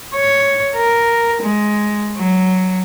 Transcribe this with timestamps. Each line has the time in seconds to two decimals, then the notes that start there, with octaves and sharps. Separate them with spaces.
0.14 C#5
0.76 A#4
1.42 G#3
2.17 F#3